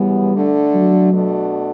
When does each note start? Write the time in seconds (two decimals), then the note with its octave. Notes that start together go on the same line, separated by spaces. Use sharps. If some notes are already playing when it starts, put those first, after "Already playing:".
Already playing: F#2 C#3 E3 G3 B3
0.34 D3 A3 D4
0.74 F#3
1.13 B2 A3 D4 F#4